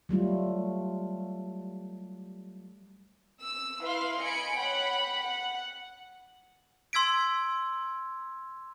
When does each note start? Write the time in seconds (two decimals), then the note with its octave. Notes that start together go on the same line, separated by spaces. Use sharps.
0.09 F#3 G3 A3 F4
3.40 E6
3.81 E4 B4 F5 C6
4.20 D#5 G#5 B5 C#7 D7
4.57 C#5 F#5 G5 B5
5.21 F#5
6.93 C6 E6 G#6 B6 D7